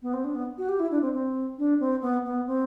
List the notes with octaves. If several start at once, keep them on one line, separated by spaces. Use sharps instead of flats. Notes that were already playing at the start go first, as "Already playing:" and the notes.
B3
C4
D4
B3
F#4
G4
E4
D4
C4
C4
D4
C4
B3
B3
C4